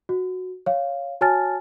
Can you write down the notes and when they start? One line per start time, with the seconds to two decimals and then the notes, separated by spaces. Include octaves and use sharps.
0.09 F#4
0.66 C#5 F5
1.21 F#4 C#5 G#5 A5 F6 A6